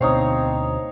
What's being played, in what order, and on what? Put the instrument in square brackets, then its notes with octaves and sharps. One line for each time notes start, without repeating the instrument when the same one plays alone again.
[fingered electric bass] D2 B2 [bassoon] C4 [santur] D#4 C#5 F5